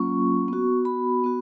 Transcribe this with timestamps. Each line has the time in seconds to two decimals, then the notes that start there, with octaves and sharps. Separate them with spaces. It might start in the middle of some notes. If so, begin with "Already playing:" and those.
Already playing: F#3 A#3 C#4 F4 C#6
0.48 B3 F#4
0.85 B5
1.24 B3 F#4